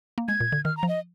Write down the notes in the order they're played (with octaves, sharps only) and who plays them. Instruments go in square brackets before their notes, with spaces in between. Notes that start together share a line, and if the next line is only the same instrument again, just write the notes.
[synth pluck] A#3
[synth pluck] G#3 [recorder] G#6
[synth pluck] A#2
D3
[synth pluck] D#3 [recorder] F6
[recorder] A#5
[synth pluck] F3
[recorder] D#5